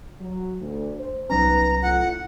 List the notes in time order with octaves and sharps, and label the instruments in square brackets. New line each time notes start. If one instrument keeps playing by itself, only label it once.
[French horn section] F#3
D2
C5
[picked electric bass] C2 F#3 C#4 [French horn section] B3 D#4 B4 [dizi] A#5
[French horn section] A2 F4 [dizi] F#5